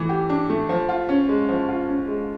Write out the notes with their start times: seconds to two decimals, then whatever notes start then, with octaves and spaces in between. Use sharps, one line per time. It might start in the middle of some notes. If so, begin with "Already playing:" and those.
Already playing: E3 A3
0.09 G4
0.29 D4
0.49 A3
0.69 F3
0.89 F4
1.09 C#4
1.29 G#3
1.48 F3
1.68 F4
1.89 C#4
2.08 G#3